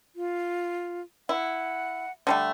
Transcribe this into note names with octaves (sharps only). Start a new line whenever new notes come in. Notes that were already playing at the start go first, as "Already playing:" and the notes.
F4
E4 F#5
D3 G3 A3